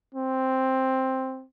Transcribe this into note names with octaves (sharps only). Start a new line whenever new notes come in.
C4